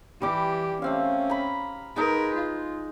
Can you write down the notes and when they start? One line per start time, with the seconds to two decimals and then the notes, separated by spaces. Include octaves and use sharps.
0.22 E3 G3 G4 D6
0.82 A3 C4 C#4 F5
1.30 A#5 B5
1.96 G#3 D#4 A#4 B4
2.36 F4